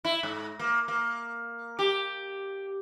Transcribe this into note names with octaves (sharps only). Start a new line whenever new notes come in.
E4
G#2
A#3
A#3
G4